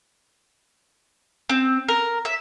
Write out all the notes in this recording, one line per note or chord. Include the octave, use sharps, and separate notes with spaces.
C4
A#4
E5